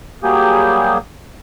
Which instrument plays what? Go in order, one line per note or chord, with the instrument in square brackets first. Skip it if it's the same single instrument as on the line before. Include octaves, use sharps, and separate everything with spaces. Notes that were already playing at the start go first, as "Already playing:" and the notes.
[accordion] F#3 G3 A#3 G4 G#4